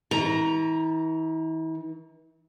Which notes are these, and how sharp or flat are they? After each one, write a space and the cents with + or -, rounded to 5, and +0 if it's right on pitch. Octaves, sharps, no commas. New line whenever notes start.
E3 -40 A#5 +0